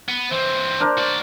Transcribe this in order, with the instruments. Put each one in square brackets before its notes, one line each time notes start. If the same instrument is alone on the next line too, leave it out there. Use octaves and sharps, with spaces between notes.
[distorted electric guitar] B3
[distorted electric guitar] E3 C4 [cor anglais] C5
[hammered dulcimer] D4 A#4
[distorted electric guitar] F#4 D5